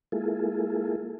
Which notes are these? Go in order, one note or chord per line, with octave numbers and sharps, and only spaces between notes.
G#3 A#3 E4 F4 G#4 A4